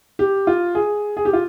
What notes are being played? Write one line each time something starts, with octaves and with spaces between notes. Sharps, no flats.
G4
F4
G#4
G#4
G4
F4